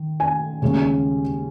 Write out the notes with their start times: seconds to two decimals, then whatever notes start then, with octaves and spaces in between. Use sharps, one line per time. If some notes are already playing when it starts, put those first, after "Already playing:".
Already playing: D#3
0.20 G#5
0.62 D#2 C#3 G#3 C#4